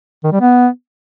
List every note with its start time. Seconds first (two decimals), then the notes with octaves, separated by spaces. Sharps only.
0.24 D#3
0.32 G3
0.41 B3